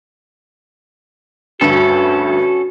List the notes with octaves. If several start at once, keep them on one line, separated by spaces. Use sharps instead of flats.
D2 G2 C#4 F#4 A4